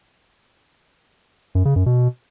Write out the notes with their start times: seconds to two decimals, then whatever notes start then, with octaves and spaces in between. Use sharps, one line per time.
1.55 F#2
1.65 C#3
1.76 F#2
1.86 B2